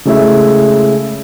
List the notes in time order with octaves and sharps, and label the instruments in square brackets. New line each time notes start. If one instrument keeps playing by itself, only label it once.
[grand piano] C#3 G#3 A3 E4